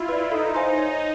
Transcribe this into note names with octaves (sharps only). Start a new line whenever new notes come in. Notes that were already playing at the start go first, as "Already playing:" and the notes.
Already playing: E4 F4
B4 D5
D#4 A4
C5 F5 G#5 C6
C#5